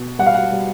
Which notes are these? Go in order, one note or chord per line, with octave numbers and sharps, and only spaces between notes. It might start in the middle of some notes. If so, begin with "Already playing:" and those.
Already playing: B2
G3 F#5
F5
F#5
G3